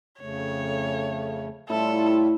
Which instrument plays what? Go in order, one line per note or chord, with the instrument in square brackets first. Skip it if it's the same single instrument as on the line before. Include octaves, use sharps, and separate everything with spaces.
[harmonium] F2 C#3 A3 [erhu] C#5
[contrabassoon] A2 [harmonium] G3 F4 E5 [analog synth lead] E4 [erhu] A4